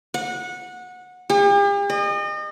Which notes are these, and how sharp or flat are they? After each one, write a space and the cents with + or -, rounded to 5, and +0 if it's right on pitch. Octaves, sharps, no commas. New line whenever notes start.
F#5 -20
G4 +45
D#5 -35